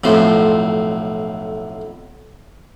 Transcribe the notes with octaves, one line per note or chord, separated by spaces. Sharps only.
B1 F2 A2 C5